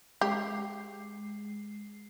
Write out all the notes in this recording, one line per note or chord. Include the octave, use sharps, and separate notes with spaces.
G#3 G4 C7